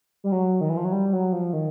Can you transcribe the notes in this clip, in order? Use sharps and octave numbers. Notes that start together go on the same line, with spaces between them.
G3
F#3
D#3
E3
F3
F#3
G3
F#3
F3
D#3